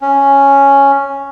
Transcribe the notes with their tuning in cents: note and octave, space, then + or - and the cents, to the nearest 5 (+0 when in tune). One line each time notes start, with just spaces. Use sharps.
C#4 +0